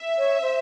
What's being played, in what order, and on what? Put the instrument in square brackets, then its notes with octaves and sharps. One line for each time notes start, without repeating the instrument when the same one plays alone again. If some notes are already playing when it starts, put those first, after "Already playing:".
Already playing: [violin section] E5
[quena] C#5
C5